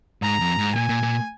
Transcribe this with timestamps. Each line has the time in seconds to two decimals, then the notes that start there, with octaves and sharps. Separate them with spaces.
0.22 G#2 A#5
0.40 F2
0.58 G#2
0.75 A#2 G#5
0.89 A#2
1.03 A#2